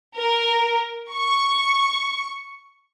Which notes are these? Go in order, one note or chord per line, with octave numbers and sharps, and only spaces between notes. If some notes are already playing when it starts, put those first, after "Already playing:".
A#4
C#6